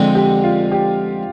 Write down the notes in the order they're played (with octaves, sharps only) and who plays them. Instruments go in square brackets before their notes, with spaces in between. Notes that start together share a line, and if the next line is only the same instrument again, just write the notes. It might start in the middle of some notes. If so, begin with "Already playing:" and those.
Already playing: [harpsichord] F2 D3 G#3 C4
[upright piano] G4
F4
G4